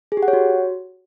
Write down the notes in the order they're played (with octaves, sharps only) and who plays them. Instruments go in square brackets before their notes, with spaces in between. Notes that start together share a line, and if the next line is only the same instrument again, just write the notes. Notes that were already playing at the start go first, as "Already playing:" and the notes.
[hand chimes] G#4
G4
F#5
C#5
F#4